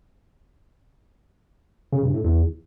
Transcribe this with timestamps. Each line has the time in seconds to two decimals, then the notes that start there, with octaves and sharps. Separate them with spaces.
1.92 C#3
2.03 G2
2.14 A2
2.24 E2